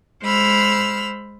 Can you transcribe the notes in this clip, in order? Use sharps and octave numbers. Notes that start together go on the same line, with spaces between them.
G#3 C5 B5 E6 F6